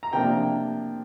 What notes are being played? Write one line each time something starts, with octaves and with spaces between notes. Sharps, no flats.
A#5
C3 F3 A#3 D4 G5